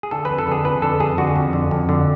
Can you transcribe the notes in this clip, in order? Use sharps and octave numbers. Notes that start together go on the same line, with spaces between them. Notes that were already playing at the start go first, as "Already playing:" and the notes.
G#4
D3 A4
B4
F2
A4
D3 G#4
F2 B4
D3 A4
F2 G#4
D3 F#4
F2
D3
F2
D3